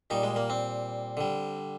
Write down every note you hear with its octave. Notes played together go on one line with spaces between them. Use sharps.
A#2 G3 D#4
G#3
A#3
C4
D3 G3